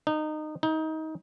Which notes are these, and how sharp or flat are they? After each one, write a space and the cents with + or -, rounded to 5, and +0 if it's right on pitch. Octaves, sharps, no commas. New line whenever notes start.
D#4 -20
D#4 +25